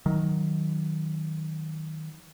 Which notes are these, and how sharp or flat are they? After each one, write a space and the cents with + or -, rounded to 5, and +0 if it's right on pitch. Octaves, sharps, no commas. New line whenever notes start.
D#3 +10 F#3 +0